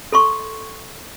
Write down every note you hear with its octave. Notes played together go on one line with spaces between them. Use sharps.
A4 C6 C#6